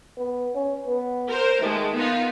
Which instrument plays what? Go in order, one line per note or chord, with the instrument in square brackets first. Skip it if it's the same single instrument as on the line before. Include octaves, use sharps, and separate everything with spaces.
[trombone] B3
C#4
B3
[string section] A#4 C5
[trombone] D#3 [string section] G#3 A3
[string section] B3 D#4 F4